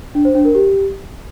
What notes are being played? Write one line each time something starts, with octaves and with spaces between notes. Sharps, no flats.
D4
C5
D4
A#4
G4